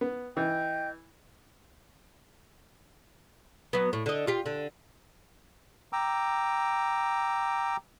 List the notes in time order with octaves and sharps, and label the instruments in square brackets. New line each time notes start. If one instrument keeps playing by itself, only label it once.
[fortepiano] B3
[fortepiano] E3 [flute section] D#5 G5 G6
[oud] F#3 B3
A2
D3 D#5
F4 G4
D3
[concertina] G5 A#5 D6 E6